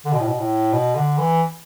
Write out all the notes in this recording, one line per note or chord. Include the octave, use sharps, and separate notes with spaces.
D3
B2
A2
B2
A2
B2
D3
E3